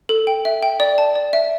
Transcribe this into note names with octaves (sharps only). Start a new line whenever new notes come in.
A4
G5
E5
G5
D5
A5
D5
E5